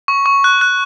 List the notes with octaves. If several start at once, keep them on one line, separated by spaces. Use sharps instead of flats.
C#6
C#6
F#6
F#6